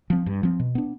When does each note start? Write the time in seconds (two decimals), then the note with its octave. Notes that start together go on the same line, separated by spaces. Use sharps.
0.10 F3 C4
0.26 G2
0.43 F3 C4
0.60 B2
0.75 B3 D4